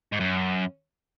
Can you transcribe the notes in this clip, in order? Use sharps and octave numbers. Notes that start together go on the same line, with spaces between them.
G#2
F#2